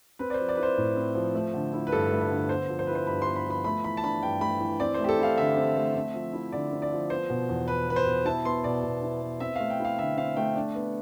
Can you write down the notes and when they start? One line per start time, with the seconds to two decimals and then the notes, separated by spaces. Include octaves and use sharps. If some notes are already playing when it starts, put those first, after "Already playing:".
0.19 C4 B4
0.30 D5
0.34 C5
0.39 F3
0.49 D5
0.55 E4 B4
0.63 C5
0.78 A2
0.96 C4
1.15 F3
1.35 A3
1.54 D3
1.73 E4
1.87 B4
1.92 G2 A4
2.11 A3
2.21 B4
2.30 D3
2.49 B3 C5
2.68 F3
2.79 C5
2.87 E4 B4
2.95 C5
3.07 G2 B5
3.22 C6
3.27 B3
3.36 B5
3.46 F3 B5
3.64 A3 B5
3.84 E3 B5
3.97 A5
4.04 D4 B5
4.23 G2 G5
4.41 A3 B5
4.60 E3
4.80 C4 D5
4.94 C5
4.99 A3 G4
5.09 A4
5.19 E4 F5
5.38 D3 E5
5.57 C4
5.76 A3
5.96 C4
6.14 F3
6.33 E4
6.52 D3 D5
6.72 C4
6.82 D5
6.92 F3
7.10 B3 C5
7.30 B2
7.49 E2
7.67 E2 B4
7.87 B3 B4
7.96 C5
8.06 B2
8.25 E4 A5
8.45 B3 C6
8.64 B2 D5
8.83 B2
9.02 E4
9.22 B3
9.40 C4 E5
9.56 A3 F5
9.70 G5
9.80 E4 F5
9.98 D3 E5
10.17 C4 F5
10.36 A3 G5
10.55 D4
10.75 B3